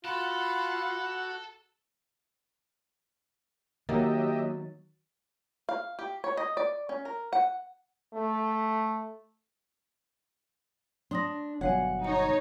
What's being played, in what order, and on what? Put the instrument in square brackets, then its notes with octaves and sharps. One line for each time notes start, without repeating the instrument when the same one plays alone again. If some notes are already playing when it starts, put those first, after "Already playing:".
[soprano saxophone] F4 [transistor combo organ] F#4 [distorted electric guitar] A4 [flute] B5
[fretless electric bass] D#3 [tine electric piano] F#3 A6 [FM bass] A#3 [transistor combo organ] G4 D#5 E5
[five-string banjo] F5
G4
C#5
D#5
D5
C#4
A#4
F#5
[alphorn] A3
[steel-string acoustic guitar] D4 [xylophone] C6 D#6 A#6
[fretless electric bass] G1 B2 F#3 [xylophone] C#5 F5 G#5 [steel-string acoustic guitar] F#5
[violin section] D#4 C#5 [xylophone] C#7